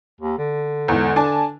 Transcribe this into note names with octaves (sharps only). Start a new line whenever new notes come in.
D#2
D3
E2 G#2
D4 G#5 A5